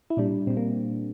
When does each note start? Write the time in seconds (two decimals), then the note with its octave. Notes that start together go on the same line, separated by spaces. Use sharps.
0.10 E4
0.17 A#2 G3 D4
0.47 A#2 C4
0.50 G3
0.57 A#3